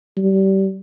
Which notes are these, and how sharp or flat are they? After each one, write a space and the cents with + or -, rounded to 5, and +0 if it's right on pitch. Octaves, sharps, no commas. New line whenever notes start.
G3 -25